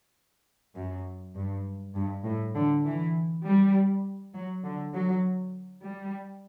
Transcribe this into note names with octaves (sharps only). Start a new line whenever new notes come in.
F#2
G2
G2
A2
D3
E3
G3
F#3
D3
F#3
G3